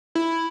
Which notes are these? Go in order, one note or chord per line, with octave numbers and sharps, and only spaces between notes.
E4